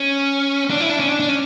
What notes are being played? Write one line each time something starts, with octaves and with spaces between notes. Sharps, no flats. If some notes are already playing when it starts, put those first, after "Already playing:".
Already playing: C#4
D4
E4
D4
C#4
D4
D4
C#4